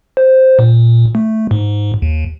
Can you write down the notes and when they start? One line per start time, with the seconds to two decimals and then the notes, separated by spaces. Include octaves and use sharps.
0.17 C5
0.59 A#2
1.15 A3
1.51 G#2
2.02 D#2